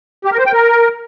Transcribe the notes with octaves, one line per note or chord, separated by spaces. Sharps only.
G4
A#4
C5
G5
A#4